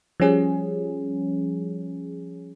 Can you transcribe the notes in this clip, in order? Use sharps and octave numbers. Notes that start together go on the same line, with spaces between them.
F3 G3 C#4 G#4